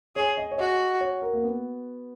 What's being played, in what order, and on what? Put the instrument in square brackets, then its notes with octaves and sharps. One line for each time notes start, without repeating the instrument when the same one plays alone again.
[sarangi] G#4 [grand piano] C#5
[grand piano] D#5
C#5
[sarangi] F#4 [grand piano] D#5
[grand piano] C#5
A#4
A#3
B3